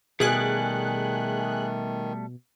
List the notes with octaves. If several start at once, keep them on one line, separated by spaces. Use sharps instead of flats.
B2 D#3 G3 A3 G#4 F#6